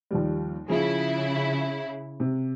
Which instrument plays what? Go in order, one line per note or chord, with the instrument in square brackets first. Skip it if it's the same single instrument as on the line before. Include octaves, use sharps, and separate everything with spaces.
[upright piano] D#2 F3 G3
[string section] C#3 E4 [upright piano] F3 G#4
[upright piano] C3